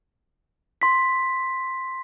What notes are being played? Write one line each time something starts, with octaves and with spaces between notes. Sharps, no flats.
C6 B6